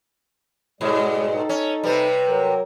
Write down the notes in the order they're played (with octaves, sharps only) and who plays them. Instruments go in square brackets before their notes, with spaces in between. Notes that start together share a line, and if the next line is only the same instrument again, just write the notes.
[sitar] G#2 B2 [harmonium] G3 G#3
[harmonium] D#4 A4
[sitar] C#4
[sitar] C3 G3 [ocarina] B4
[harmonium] F#3 A#4